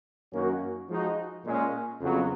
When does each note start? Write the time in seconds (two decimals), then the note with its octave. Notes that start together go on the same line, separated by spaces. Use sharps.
0.33 F#2 D#3 A#3 C#4 F#4
0.89 F3 G#3 D#4 F#4
1.45 A#2 G#3 C#4
2.01 F2 C#3 F#3 B3